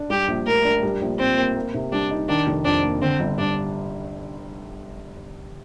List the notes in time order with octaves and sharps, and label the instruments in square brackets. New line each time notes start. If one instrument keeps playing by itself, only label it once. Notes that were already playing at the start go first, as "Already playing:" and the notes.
Already playing: [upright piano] D4
[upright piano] G3 [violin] G4
[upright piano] A#1
[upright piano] A2 [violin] A#4
[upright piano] D4
G3
A#1
[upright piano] A#2 [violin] C4
[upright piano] A#3
A#3
C3
[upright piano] G3 [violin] D4
[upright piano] D#4
[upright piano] D#3 [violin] D4
[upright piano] F1
[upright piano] F2 [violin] D4
[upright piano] A#3
[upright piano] D3 [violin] C4
[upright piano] G1
[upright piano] G2 [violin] D4